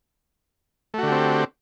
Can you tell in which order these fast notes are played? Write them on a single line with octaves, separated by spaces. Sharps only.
A3 F#4 D3 G4 C4